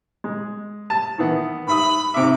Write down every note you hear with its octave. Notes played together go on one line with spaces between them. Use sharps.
G#3
A5
D#3 E3 B3
G#2 E5 B5 D#6
G#2 C3 E5 D6